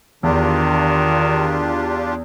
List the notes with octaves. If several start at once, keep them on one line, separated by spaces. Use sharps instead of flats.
E2 D#3 D4 F4 G4